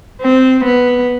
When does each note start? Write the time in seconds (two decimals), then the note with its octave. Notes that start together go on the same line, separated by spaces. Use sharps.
0.22 C4
0.64 B3